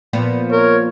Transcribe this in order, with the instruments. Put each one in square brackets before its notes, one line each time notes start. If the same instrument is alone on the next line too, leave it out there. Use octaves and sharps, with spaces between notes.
[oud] A#2 F3 B3
[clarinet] A#4 [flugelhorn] C#5